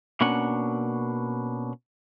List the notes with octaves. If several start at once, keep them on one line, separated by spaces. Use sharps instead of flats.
B2 A#3 C#4 D4 F#5